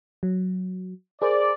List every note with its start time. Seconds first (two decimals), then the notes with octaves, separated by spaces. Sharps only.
0.23 F#3
1.22 G#4 A#4 C5 D5